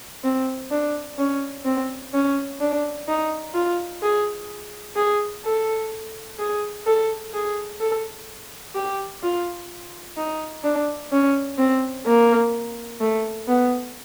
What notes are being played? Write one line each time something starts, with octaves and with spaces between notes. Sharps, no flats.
C4
D4
C#4
C4
C#4
D4
D#4
F4
G#4
G#4
A4
G#4
A4
G#4
A4
G4
F4
D#4
D4
C#4
C4
A#3
A3
B3